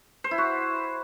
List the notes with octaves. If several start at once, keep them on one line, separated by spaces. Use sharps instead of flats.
C5
E4
F#4